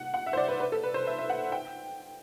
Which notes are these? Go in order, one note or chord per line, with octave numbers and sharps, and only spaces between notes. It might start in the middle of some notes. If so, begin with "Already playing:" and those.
Already playing: F#5
F#5
E5
C5
D5
B4
B4
A4
B4
C5
E5
E5
F#5
G5